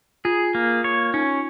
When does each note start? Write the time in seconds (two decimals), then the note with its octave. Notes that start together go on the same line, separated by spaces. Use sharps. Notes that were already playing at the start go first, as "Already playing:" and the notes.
0.25 F4 G#4
0.55 A#3
0.84 C#5
1.14 C#4 D#4